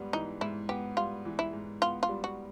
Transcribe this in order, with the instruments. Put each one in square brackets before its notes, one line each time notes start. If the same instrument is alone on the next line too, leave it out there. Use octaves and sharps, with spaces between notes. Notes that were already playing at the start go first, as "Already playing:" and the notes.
Already playing: [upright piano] G#2 G3 B3
[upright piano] E3 [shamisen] D#4
[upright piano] G#2 [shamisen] E4
[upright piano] B3 [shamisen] G4
[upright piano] G3 [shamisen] F4
[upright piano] E3
[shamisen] E4
[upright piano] G#2
[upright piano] B3 [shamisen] F4
[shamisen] F4
[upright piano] G3
[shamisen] F#4